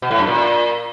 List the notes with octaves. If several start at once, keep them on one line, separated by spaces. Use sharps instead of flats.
B2
A2
F#2
A#2